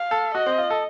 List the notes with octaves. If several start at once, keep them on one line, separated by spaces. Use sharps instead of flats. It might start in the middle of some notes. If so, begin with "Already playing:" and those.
Already playing: F5
A4
F#4 D#5
C4
F4
A4